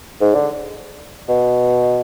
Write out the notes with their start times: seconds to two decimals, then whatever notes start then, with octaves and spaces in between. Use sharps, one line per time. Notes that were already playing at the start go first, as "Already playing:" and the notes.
0.21 G#2
0.34 D3
1.29 B2